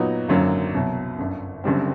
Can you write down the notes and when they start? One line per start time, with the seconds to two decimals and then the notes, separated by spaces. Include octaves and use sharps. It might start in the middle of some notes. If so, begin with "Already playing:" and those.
Already playing: A#2 F#3 B3 D#4 F#4
0.28 G#1 F#2 D3 F#3 A#3
0.74 C2 B2 F#3
1.19 G1 F#2 D3
1.64 F#1 F#2 D3 G3 C4